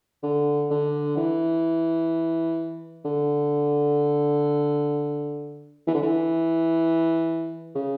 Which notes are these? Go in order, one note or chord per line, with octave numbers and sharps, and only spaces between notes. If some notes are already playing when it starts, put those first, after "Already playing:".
D3
D3
E3
D3
E3
D3
E3
C#3